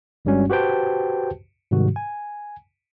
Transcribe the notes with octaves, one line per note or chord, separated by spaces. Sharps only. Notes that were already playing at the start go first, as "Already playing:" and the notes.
G1 G2 G3 G#3 C#4 F#4
F#4 G4 B4 C5 G5 A5
G#2 C3 D#3 G3 F#4
G#5